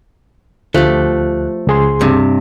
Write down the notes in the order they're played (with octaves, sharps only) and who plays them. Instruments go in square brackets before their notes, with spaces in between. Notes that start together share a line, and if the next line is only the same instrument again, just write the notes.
[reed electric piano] D2 F#6 [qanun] F3 G4 [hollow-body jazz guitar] A3
[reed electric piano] C#2 G#4 C6
[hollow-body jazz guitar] G2 C3